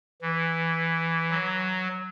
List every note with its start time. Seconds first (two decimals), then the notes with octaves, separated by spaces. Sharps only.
0.21 E3
1.31 F#3